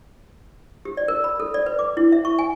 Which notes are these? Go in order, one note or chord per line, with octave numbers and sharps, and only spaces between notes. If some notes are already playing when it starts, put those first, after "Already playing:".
G4
D5
A#4
B5
A4
D5
B4
D6
E4
E5
C#6
G#5